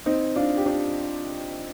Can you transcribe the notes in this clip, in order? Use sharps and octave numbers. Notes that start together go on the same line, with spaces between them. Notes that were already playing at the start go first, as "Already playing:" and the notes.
C4 D#4
D4 F4
G4
D4 F4